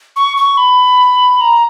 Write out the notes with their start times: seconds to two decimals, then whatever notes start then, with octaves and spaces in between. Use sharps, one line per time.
0.16 C#6
0.37 C#6
0.57 B5
1.41 A#5